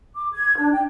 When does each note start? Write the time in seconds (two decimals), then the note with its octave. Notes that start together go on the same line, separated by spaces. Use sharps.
0.16 D6
0.35 G#6
0.58 D4
0.72 G5